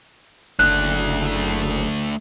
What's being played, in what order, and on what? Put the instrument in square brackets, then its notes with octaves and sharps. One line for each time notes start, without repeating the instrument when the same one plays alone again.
[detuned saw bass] F#1 [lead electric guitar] A3 D4 [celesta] F#6